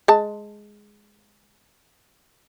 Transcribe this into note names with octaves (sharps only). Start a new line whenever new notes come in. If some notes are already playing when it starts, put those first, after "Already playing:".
G#3 A5